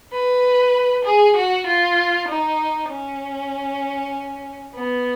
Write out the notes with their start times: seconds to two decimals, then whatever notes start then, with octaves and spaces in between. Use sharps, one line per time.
0.12 B4
1.05 G#4
1.37 F#4
1.67 F4
2.28 D#4
2.90 C#4
4.75 B3